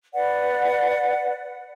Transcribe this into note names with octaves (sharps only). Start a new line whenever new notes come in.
B4 D5 F#5